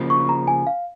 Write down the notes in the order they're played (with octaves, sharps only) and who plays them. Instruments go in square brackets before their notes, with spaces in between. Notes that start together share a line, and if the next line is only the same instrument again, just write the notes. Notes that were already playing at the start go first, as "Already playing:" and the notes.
Already playing: [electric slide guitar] C#3 F3 A#3
[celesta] C#6
A#5
G#5
F5